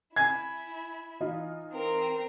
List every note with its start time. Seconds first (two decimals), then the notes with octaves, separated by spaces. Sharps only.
0.16 E4 G#5 G#6
1.20 E3 D#4 F4
1.73 C4 A#4